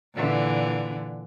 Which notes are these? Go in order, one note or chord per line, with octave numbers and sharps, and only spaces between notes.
A#2 D3 E3